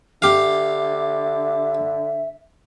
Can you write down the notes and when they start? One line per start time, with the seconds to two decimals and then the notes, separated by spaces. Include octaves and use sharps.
0.22 D3 G4 E5 F5